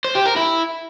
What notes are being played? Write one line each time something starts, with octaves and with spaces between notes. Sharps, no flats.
C5
G4
A#4
E4